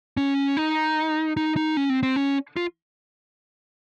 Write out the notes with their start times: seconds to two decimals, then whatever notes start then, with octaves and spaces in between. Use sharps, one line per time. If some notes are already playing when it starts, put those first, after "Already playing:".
0.17 C#4
0.57 D#4
1.37 D#4
1.56 D#4
1.77 C#4
1.90 C4
2.03 C4
2.16 C#4
2.56 F4